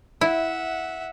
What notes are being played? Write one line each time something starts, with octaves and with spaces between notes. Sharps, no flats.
E4 E5 F#5